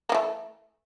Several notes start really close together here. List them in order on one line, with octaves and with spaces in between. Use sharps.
A#3 E3 A3